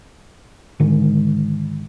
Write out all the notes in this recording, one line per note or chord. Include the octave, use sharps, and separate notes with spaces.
G#2 D3 D#3 G#3